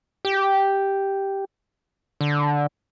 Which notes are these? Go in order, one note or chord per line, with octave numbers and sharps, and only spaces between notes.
G4
D3